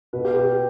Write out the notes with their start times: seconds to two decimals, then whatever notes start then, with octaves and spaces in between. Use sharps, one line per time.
0.13 B2 B4
0.25 G4
0.36 G4